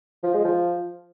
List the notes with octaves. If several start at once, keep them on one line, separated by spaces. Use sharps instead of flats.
F3
G#3
F3